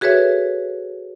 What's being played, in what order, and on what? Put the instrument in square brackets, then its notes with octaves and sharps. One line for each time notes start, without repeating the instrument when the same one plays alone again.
[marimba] F#4 G#4 A4 B4 C#5 E5